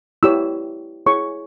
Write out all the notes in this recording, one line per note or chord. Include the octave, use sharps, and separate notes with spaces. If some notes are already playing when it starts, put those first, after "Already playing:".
E4 G4 C#5 E6
E4 G#4 C#5 C#6